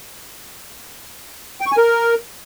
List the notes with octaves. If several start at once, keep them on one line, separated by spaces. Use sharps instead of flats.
G5
C#6
G#5
A#4